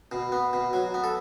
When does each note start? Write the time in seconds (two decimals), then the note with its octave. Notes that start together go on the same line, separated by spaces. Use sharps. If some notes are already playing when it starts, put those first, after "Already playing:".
0.12 B2
0.32 B3
0.53 B2
0.73 F#3
0.94 B3
1.04 A4